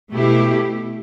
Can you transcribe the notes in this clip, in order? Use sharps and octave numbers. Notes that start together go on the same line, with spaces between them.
B2 A3 E4 G4